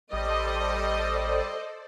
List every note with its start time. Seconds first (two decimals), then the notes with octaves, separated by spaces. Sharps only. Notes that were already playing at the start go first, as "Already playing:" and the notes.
0.13 A1 G3 A4 C5 D5 D#5